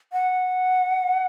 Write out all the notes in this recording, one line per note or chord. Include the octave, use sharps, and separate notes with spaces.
F#5